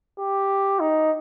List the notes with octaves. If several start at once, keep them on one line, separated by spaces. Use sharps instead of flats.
G4
D#4